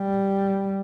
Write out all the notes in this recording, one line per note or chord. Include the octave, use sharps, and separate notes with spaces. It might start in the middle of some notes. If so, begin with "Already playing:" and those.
Already playing: G3